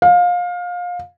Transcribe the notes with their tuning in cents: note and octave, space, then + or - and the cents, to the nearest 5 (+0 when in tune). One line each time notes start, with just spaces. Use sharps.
F5 +25